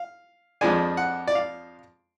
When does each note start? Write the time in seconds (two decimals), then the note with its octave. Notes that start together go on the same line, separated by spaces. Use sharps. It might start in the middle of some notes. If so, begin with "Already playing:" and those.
Already playing: F5
0.61 F2 F3 G#3 D4 G#5
0.97 F#5
1.27 D5
1.35 F5